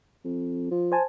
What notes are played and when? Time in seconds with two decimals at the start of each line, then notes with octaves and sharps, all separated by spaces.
0.24 F2
0.71 F3
0.92 C5 G#5 A5